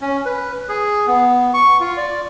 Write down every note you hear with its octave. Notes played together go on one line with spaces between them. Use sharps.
C#4
B4
G#4
B3
C#6
F4
D5